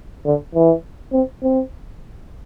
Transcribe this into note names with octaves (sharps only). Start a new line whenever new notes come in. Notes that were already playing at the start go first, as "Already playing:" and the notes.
D3
E3
C4
C4